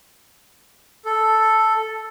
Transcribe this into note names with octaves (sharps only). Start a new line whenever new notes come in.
A4